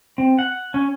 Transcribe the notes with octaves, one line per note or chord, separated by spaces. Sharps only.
C4
F#5
C#4